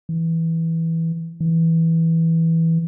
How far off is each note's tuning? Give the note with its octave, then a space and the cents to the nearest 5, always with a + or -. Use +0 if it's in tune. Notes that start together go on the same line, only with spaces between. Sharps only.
E3 -10
E3 -10